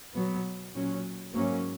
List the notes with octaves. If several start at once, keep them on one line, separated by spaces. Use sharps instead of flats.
B2 F#3 B3
A#2 F#3 C#4
G#2 F#3 A#3 C#4